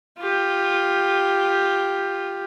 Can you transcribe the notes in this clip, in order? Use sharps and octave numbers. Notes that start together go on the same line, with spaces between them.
F4 G4